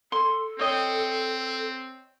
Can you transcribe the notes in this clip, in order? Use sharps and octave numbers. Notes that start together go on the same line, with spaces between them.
A4 C6
C4 C#5 D#5 G5